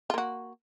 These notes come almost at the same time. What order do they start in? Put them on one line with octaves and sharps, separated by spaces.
F4 A#3 F#4